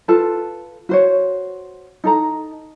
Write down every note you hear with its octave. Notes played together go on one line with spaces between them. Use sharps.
F4 A4 B4 A5
F#4 C5 C#5
D#4 A4 A#5